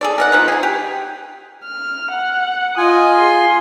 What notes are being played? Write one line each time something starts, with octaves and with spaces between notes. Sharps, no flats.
G#4 A4 D5
A#4 D#5 F#5
F3 B3 D#4
G#4 G#5
G4
F6
F#5
F4 D#5 G#5 D#6
G#4 C6